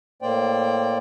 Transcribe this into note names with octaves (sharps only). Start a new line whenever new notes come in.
A2 A#3 C5 D5 G5